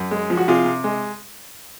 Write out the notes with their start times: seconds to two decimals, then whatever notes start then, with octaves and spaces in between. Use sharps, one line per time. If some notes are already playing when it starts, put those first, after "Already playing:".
Already playing: F#2
0.11 G#3
0.30 F3
0.37 F#4
0.48 C3 F4 G#4
0.65 C3
0.84 G#3